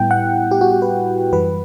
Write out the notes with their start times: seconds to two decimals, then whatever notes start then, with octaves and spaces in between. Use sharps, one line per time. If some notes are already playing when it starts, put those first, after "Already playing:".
Already playing: A2 G3 B3 E4 G5
0.11 F#5
0.51 G4
0.61 F#4
0.71 G4
0.82 B4
1.32 F#2 E3 G3 B4